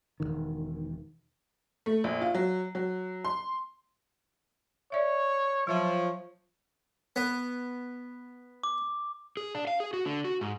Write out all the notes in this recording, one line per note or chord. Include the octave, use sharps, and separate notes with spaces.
E1 B1 D#3
A3
A#1
F4
F#3
F#3
C6
C#5 D5 E5
F3 F#3 C#5 E5
B3
D6
G#4
D4
F5
G#4
F#4
D3
F#4
G#2